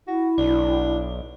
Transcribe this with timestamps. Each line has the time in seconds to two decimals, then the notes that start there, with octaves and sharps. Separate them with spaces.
0.07 E4 F#4
0.38 B1 D4